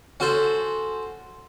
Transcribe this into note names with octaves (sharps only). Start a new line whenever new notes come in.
C#4 F#4 A4 C5